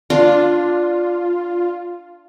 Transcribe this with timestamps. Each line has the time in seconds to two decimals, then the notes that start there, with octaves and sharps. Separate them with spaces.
0.10 D4 F4